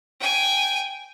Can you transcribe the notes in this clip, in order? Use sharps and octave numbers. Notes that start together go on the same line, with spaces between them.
G5 G#5